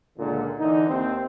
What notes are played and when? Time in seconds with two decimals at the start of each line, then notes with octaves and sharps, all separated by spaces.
0.17 C#2 A#2 D3
0.58 D3 E3 D#4
0.88 D#2 C4